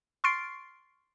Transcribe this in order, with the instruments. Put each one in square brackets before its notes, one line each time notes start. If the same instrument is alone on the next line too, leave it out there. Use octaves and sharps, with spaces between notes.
[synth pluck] C6 C#6 F6 A6 C7 D7